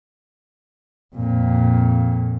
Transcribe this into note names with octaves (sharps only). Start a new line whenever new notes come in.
F2 A#2